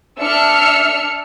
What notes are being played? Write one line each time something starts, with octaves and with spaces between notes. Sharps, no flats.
D4 E5 E6 F6 C#7